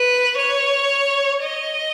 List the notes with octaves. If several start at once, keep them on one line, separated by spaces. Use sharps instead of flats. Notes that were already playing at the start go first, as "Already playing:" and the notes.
Already playing: B4
C#5
D#5